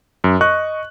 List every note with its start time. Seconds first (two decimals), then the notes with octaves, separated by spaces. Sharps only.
0.24 F#2
0.41 D#5 C#6 F#6